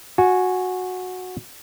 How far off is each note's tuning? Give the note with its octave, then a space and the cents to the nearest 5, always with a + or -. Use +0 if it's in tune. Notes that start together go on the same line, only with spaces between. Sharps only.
F#4 -15 G#5 +5